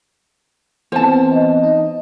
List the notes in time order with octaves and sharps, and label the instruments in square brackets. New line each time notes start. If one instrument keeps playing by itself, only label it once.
[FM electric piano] E3 B3 C4 [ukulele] C5 A5
[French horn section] D#5
[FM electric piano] D#4